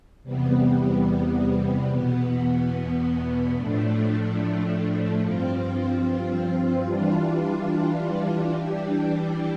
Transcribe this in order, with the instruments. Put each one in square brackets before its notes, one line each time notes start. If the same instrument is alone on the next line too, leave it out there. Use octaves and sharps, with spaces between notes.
[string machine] E2 C3 G3 B3
E2 B2 B3
A2 F3 A3 D4
G2 F3 C4 F4
E3 G3 D4 F4
E3 G3 D4 G4